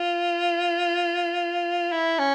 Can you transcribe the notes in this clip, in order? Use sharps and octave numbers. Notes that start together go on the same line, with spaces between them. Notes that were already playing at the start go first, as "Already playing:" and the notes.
Already playing: F4
E4
C#4